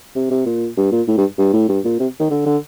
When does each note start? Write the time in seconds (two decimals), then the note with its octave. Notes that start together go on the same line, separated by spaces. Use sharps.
0.15 C3
0.31 C3
0.46 A#2
0.77 G2
0.91 A#2
1.08 A2
1.17 G2
1.39 G2
1.54 A2
1.69 G2
1.85 A#2
2.00 C3
2.20 D#3
2.31 D3
2.46 D3